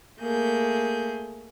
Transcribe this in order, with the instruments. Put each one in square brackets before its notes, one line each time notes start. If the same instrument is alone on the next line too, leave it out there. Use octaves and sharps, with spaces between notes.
[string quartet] A3 A#3 G#4 G6